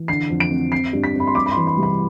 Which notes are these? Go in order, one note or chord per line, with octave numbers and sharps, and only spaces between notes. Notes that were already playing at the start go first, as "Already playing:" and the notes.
Already playing: E3
D3 C7
F2
D7
C4
C4 C7
G2
B6
C4
B5
C6
G3 D6
B5
C6
E3
B5
C2
B5